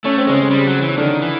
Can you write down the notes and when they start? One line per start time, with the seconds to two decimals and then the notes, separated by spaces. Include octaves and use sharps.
0.04 A3 C#4
0.17 C4
0.27 C#3 G#3 C#4
0.51 G3
0.67 F#3
0.82 E3
0.88 C#4
0.97 D3 D#3 D4
1.21 E3